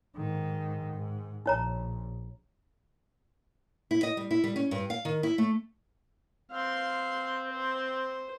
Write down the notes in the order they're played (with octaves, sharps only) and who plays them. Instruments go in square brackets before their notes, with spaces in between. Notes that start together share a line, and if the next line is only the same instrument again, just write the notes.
[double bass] G#2 D#3
G#2
[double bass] A#1 [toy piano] D#4 C#5 A#5
[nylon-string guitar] E4
D#5
G3
E4
G3
C#4
G2
F5
D#3
E4
A3
[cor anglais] C4 [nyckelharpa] F5 C6
[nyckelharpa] C5